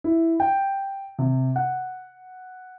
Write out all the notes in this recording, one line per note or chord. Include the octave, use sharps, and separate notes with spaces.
E4
G5
C3
F#5